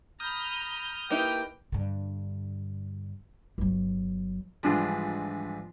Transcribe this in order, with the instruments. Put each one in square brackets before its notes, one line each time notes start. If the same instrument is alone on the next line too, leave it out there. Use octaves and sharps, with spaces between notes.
[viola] A#5 B5 [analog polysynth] D#6 F6 G6
[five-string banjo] A#3 D#4 E4 [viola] G4 B4 [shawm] G5
[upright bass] G2 D3
G1 F#3
[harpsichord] G#2 E3 G3 [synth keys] F3 D4 F4